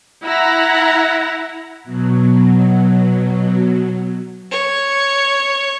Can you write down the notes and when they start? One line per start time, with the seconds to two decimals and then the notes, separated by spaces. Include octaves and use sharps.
0.23 E4 F#5 A#5
1.84 B2 F#3
4.51 C#5